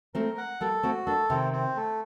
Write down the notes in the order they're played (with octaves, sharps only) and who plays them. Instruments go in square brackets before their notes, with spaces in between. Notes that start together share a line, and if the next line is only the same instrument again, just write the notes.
[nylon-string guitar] A3 C4 [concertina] A#4
[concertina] F#5
[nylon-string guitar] G3 A#3 [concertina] A4
[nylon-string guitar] A3 C4 [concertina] F#4
[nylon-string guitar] A#3 D4 [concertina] A4
[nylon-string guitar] C3 D#3 [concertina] C4
[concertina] C4
A3